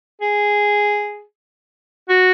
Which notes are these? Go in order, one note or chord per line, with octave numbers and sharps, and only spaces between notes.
G#4
F#4